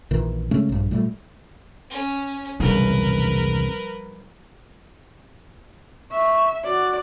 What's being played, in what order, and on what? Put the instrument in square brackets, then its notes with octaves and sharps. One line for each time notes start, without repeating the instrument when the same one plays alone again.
[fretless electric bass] A#1 A#2 D#3 E3
C#3 G#3 A3 C#4
A#1 G2
A#2 G3 A3
[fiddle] C#4
[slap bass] E1 C2 C#3 [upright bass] F3 G3 [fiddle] A#4 B4
[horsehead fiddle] E5 [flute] C#6
[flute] F#4 [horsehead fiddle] D5